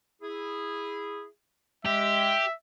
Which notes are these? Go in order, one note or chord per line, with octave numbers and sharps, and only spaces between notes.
E4 G#4
G#3 G4 E5